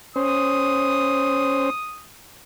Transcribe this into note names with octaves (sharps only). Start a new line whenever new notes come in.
C#4 C5 D#6